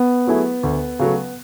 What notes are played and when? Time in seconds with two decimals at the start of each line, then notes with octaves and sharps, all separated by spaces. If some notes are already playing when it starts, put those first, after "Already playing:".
Already playing: B3
0.27 F#3 A3 E4 G#4
0.63 D2
0.99 C#3 F#3 A3